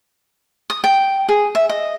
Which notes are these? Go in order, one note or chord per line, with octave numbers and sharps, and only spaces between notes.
D#6
G5
G#4
E5
D#5